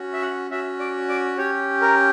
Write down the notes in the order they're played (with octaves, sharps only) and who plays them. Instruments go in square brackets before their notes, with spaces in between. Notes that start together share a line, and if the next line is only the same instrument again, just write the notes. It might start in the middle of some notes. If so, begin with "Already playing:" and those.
Already playing: [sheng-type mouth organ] C#4 F#4
E5
F#5
C#4 F#4 E5
D5
D5
C#4 G4 C#5
A#4